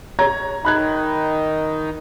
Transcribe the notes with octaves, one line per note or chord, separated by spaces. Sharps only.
C#5 A#5 G#6
D#3 D#4 B5 F#6 G#6